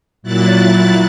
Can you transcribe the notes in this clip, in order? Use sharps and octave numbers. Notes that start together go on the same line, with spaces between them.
A#2 F#3 E4 F#6 A6